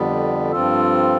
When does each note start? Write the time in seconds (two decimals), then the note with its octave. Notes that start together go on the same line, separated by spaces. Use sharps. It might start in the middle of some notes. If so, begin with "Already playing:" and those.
Already playing: F2 D3 G3 B3
0.52 G2 F3 C4 F4 A4